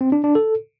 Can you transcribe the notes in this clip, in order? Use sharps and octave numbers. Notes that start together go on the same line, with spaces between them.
C4
D4
D4
A4